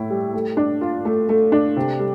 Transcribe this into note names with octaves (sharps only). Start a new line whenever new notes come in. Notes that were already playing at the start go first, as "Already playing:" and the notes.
Already playing: A2 E4
G3
A3
D4
F4
A3
A3
D4
C3
G3